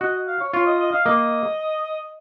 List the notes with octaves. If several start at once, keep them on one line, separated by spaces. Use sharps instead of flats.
F#4 D#5
F5
C#5
F4 C#5
D#5
D#5
F5
A#3 D#5